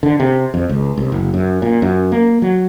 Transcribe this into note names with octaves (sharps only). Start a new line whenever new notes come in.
D3
C3
F2
C#2
C2
F#1
F#2
A#2
F#2
A#3
F#3